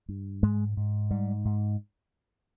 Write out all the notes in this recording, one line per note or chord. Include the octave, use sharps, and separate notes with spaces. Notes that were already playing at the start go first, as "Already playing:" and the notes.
G2
G#2 G#3
G#2
G#2 G3
G#2